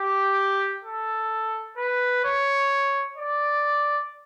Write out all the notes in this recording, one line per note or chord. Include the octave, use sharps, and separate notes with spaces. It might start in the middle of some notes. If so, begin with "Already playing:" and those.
Already playing: G4
A4
B4
C#5
D5